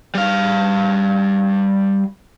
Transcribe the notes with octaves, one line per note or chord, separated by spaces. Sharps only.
G3 F5